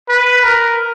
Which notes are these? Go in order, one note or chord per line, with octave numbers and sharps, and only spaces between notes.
B4
A#4